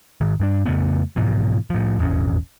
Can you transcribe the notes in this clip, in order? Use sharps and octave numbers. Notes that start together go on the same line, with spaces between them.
G#2 D#3
G2 G3 D4
F2 C#3 A3 B3
G#2 B2 E3 F3
A2 F3
D#1 G#1 E2 C#4